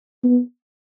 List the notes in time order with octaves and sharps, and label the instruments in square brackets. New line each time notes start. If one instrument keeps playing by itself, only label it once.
[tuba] B3